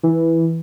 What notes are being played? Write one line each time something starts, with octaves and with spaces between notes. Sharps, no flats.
E3